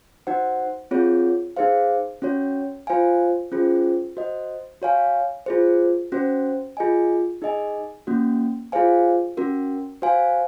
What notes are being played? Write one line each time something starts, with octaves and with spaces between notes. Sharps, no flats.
D#4 F#4 C5 F#5
C4 F4 G#4 C#5
D#4 G#4 C5 F5
C#4 F#4 C#5
F4 C5 F5 G#5
C#4 F4 G#4 C5
F#4 C5 D#5
F#4 C#5 F5 G#5
F4 G#4 C5
C#4 F#4 C5
F4 G#4 D#5 G#5
D#4 G#4 D#5 G#5
A#3 C#4 F#4
F4 G#4 C5 F5 G#5
C#4 F#4 A#4
F#4 C5 F5 G#5